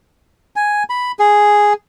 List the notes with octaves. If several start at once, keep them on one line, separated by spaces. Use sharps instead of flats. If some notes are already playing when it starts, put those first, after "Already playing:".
G#5
B5
G#4